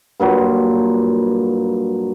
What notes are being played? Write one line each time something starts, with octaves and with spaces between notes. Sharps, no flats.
G2 A#2 F#3